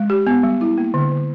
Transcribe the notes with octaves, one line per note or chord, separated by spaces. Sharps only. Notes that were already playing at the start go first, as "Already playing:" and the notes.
Already playing: G#3
G4
B3
G3
E4
A#3
D3
D3